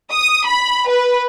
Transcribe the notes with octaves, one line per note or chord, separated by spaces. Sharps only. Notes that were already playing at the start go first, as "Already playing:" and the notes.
D#6
B5
B4